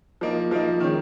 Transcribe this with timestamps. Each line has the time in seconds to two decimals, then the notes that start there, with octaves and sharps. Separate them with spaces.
0.21 F3 A#3 D#4
0.51 F3 A#3 D#4
0.80 D#3 G#3 C#4